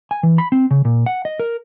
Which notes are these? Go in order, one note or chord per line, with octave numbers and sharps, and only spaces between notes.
G#5
E3
B5
C4
C#3
A#2
F#5
D#5
A#4